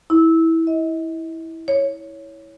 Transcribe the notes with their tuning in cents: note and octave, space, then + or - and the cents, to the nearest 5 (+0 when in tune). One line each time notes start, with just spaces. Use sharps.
E4 -15
D#5 +35
C#5 +5